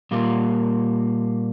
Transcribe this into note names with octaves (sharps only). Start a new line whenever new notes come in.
A#2 G3 A#3 F4